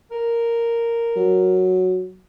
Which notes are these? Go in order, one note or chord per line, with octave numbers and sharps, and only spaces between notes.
A#4
F#3